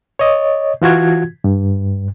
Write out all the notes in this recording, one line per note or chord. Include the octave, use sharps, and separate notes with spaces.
C#5 D#5
E3 F4 F#4 G#6
G2